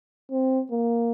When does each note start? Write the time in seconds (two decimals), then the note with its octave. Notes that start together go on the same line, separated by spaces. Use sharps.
0.31 C4
0.72 A#3